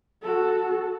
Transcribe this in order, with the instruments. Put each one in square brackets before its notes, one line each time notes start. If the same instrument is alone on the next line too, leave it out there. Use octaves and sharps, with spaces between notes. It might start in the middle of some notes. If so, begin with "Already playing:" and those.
[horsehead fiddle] F#4 A4